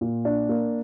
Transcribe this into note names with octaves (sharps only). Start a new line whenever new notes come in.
A#2
D4
A#3